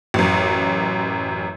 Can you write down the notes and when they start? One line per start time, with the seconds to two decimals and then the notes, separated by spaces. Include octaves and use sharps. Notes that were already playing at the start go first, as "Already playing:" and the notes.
0.14 A1 F#2